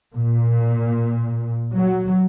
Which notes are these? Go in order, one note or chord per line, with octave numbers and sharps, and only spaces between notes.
A#2
F#3